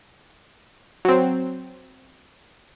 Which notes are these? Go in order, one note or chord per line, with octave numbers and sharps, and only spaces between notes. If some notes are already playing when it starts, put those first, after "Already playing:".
F#3 C4